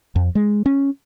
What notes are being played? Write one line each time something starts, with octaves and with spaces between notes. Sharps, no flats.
F2
G#3
C#4